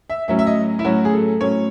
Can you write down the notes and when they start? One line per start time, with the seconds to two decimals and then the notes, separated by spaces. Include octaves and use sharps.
0.10 E5
0.28 A2 F#3 C#4 E5
0.39 E5
0.47 D#5
0.79 E4
0.85 A2 F#3 C#4 F#4
1.05 G#4
1.13 A4
1.41 A2 F#3 C#4 C#5